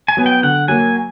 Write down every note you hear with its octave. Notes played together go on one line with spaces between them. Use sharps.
G#5
F#3 B3
G5
D3 F#5
F#3 A#3 G#5